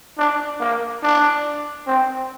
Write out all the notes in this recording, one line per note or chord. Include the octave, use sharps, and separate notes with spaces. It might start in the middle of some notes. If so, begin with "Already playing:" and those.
D4
A#3
D4
C4